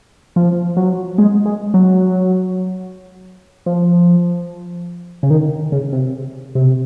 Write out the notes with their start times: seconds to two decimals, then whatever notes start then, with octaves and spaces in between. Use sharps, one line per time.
0.36 F3
0.77 F#3
1.18 G#3
1.45 G#3
1.74 F#3
3.66 F3
5.23 C#3
5.30 D#3
5.72 C#3
5.93 C3
6.55 C3